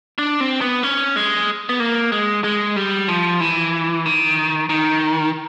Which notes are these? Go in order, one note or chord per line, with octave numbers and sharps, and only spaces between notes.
D4
C4
B3
C#4
G#3
B3
A#3
G#3
G#3
G3
F3
E3
D#3
D#3